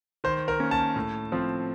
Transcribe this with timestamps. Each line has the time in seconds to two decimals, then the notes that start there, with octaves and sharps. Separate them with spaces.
0.24 D#3 C5
0.48 A#4
0.60 A#3 C#4
0.71 A5
0.96 A2
1.32 F3 C4